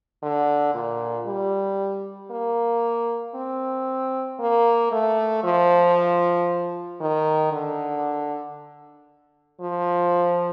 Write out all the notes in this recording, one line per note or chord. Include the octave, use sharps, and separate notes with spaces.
D3
A#2
G3
A#3
C4
A#3
A3
F3
D#3
D3
F3